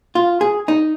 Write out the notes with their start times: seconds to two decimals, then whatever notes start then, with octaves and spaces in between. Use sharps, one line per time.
0.15 F4
0.41 G#4
0.68 D#4